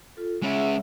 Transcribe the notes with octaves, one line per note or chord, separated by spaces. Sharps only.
F4 A4
G#3 C#4 G#4 E5 F#5